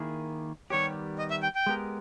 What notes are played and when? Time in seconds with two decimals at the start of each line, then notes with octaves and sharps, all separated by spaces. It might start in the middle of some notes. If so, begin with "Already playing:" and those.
Already playing: D#3 A#3 E4 G#4
0.70 D#3 G3 B3 G4 C#5
1.19 D#5
1.31 E5
1.43 G5
1.55 G5
1.66 G#3 B3 G4 A#4